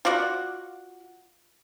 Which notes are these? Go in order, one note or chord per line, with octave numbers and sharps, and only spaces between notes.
F4 F#4 D5 F#5